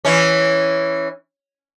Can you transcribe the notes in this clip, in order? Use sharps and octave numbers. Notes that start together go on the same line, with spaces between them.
E3 C#4